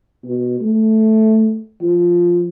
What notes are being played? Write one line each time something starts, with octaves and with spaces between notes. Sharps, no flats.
B2
A3
F3